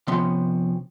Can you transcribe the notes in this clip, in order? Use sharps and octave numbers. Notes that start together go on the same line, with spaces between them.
C3 F3 B3 C#4 C6